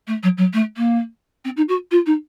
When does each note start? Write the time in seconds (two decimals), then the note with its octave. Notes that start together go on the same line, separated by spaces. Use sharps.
0.07 A3
0.23 F#3
0.37 F#3
0.53 A3
0.77 A#3
1.45 C4
1.57 D#4
1.68 F#4
1.91 F4
2.06 D#4